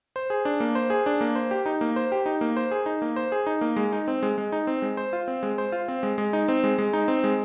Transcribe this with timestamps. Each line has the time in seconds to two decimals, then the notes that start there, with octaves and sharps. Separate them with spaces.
0.16 C5
0.30 G#4
0.45 D4
0.60 A#3
0.75 C5
0.90 G#4
1.06 D4
1.21 A#3
1.35 C5
1.51 G4
1.66 D#4
1.81 A#3
1.96 C5
2.12 G4
2.26 D#4
2.41 A#3
2.57 C5
2.71 G#4
2.86 D#4
3.02 A#3
3.16 C5
3.32 G#4
3.47 D#4
3.61 A#3
3.76 G#3
3.93 D#4
4.08 C4
4.23 G#3
4.38 G#3
4.52 D#4
4.67 C4
4.82 G#3
4.97 C5
5.13 F4
5.28 C4
5.43 G#3
5.58 C5
5.72 F4
5.88 C4
6.03 G#3
6.18 G#3
6.33 D#4
6.48 C4
6.64 G#3
6.78 G#3
6.93 D#4
7.08 C4
7.24 G#3